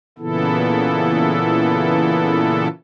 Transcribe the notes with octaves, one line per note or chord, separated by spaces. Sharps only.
A#2 C#3 E3 B3 E4 A4